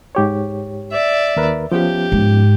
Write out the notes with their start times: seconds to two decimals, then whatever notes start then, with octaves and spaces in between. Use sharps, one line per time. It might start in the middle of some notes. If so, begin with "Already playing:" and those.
0.15 G#2 G4 C#5
0.92 D5 E5
1.37 D#2 A#4 B4
1.72 F3 B3 C#4 G4
2.12 G#2